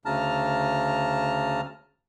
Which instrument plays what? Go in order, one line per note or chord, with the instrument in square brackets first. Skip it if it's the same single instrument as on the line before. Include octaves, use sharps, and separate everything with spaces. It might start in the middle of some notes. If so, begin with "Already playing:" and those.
[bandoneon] D2 C#3 A5 A#5 F6